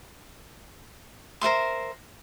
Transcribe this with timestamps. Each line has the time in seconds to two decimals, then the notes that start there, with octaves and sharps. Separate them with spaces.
1.41 A#4 C5 E5 C6